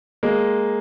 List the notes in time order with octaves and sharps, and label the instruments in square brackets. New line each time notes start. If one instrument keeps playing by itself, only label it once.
[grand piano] G#3 A#3